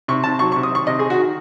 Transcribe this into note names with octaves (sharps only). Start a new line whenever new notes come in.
C3 C#6
C3 A5
F#3 C#6
C#6
C3
D#6
D#3 C#6
C3 D#5
G#4
D#3
F#4
D#3